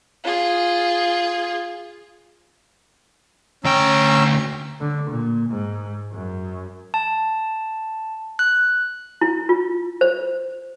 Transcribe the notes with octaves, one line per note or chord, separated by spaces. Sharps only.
F4 G#4
D2 C#4 G5 A#5 E6
D3
A#2
G#2
F#2
A5
F#6
E4
F4
C5